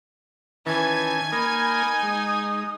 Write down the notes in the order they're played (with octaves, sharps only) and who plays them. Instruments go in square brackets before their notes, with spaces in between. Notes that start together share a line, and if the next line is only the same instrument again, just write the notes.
[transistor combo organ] D#3 C#4 A5 [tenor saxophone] E3 [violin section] G#5 G#6
[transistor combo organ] A#3 A#4 [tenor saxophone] D#4 [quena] B5
[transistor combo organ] G#3 [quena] D#6